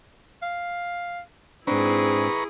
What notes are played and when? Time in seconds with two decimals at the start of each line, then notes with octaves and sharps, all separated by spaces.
0.42 F5
1.67 G#2 C4 D4 E4 G#4 B4 A#5 C#6